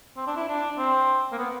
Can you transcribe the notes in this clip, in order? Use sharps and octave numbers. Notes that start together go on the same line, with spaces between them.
C4
D4
E4
D4
C4
A#3
B3